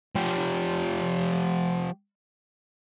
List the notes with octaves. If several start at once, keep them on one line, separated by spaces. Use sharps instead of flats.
F3 G4